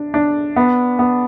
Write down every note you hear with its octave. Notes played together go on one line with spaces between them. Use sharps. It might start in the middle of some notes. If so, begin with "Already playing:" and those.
Already playing: D4
D4
B3
B3